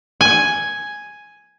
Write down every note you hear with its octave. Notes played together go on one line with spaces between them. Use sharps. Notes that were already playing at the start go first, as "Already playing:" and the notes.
G#5